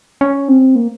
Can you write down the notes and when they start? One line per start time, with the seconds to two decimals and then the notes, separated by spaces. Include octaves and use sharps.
0.21 C#4
0.48 C4
0.76 A#3